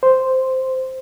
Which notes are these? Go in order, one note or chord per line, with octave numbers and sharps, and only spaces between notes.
C5